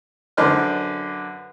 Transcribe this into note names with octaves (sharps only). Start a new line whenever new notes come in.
F#2 D3 B4 C5 D5 F6